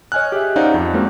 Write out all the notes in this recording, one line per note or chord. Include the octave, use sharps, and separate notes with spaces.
C#5 D#5 G#5 F6 F#6
G4 G#4 E5
C#4 D#4 C5 D5 F5 F#5
F2
G#3 A#3 C4 C#4 F#4